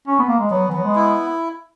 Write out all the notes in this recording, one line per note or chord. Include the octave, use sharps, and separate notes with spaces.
C#4
B3
A#3
G#3
F#3 B3
E3
F#3 B3
G#3
E4